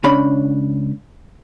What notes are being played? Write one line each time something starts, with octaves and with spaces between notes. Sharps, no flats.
C#2 C#4 D4 B5